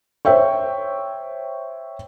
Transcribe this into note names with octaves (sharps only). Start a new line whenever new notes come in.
C5 C#5 E5 G5 C#6